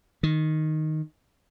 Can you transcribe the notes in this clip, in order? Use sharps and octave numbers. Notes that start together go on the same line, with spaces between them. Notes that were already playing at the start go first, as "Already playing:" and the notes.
D#3